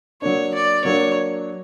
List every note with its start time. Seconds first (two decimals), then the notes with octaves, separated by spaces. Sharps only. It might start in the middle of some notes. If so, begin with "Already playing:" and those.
0.22 F#3 A#3 D4 C#5
0.54 D5
0.84 F#3 A#3 D4 C#5